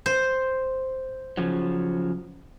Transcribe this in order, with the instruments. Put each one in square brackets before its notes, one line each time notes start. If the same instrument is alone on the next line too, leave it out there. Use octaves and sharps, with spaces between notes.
[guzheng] C5
[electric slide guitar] C#3 F3 F#3